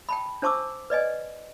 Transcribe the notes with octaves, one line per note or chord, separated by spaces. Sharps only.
G5 A5 B5
D4 C5 A5 C#6 D6 E6
B4 D5 D#5 G#5